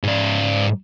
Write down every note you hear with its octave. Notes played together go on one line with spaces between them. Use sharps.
G#2 D5